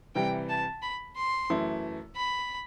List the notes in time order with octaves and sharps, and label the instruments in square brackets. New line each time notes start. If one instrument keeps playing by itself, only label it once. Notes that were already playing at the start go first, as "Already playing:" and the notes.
[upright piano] C3 E3 G3 [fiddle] G5
[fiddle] A5
B5
C6
[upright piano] F#2 E3 A3 E4
[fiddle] B5